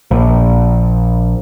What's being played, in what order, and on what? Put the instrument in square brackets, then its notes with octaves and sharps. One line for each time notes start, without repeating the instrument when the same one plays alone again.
[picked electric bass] A#1